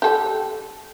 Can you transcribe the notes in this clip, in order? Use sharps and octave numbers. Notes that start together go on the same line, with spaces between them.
G4 A4